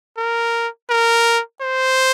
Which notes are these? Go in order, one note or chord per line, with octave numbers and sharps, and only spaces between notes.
A#4
A#4
C5